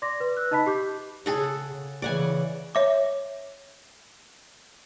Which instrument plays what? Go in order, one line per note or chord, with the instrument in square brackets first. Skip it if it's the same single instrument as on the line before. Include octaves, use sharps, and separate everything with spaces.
[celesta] D5 C6 D6 A#6
B4
E6 F#6
D#4 D#5 A5 B5 B6
G4 D6 G6
[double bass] C#3 [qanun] G#4 A4 F#5
[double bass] C#3 E3 [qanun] D5 F#5 G#5
[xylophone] C#5 E5 D6